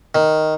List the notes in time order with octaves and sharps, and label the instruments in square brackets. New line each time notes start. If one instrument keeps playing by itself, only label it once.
[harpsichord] D#3